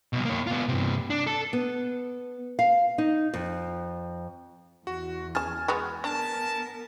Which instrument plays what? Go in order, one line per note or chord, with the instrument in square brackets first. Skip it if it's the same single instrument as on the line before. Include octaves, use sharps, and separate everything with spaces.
[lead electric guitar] C2 B2
A#3 C#5
B3 F4
G2 C3
D4
A4
[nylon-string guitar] B3
F5
D#4
F2
[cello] E2 [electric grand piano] F#4
[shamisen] C#3 A5 [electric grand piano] G#5 F6 A6
[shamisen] G#3 B3 F#4
[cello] B3 A#4 [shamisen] D4 [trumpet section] A5